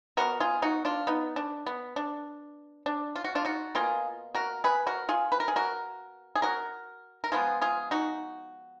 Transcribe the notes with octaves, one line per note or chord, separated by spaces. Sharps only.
B2 G#3 B3 F#4 A#4
F4 G#4
D#4 F#4
D4 F4
B3 D#4
D4
B3
D4
D4
F4
F#4
D4 F4
D#4 F#4
B2 A#3 F4 G#4
F#4 A#4
G#4 B4
F#4 A#4
F4 G#4
B4
A#4
G#4
F#4 A#4
G#4
F#4 A#4
A#4
F3 G#3 B3 F4 G#4
F4 G#4
D#4 F#4